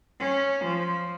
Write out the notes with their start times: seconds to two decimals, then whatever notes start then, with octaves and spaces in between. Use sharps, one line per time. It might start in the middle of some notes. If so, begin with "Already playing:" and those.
0.19 C#4
0.64 F3